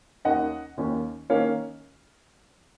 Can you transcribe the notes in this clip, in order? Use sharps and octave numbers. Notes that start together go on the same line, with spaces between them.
D#2 D#3 A#3 C#4 D#5 F#5
D#2 D#3 A#3 C#4
D#3 A#3 C#4 C#5 F5